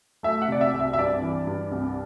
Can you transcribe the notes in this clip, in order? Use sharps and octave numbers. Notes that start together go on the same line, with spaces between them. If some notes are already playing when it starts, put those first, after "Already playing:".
A3 E5
F#5
C3 D5
E5
C2
E5
E5
G2 D5
E3
G2
C2